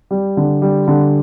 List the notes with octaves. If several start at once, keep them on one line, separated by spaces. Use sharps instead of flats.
G3
D3
G3
D3